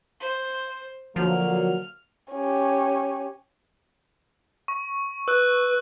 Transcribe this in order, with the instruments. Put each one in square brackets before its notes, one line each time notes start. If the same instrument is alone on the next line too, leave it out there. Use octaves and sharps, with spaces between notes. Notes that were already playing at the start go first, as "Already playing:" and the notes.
[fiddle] C5
[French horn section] D3 F#3 A#3 [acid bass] F3 [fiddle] F6
[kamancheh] C#4 G4
[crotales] C#6
[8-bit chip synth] B4 [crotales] E6 F#6